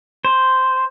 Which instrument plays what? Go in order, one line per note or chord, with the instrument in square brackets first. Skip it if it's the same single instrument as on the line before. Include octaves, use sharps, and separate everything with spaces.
[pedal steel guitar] C5